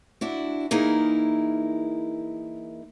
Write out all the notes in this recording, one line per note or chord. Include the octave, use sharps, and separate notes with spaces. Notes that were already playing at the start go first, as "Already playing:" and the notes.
D4 E4 F#4
E3 A#3 D#4 E4 G#4 A#4